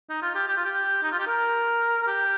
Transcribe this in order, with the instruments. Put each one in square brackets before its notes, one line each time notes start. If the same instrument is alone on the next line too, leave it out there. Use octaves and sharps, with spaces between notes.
[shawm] D#4
F4
G4
G4
F4
G4
D#4
F4
G4
A#4
A#4
G4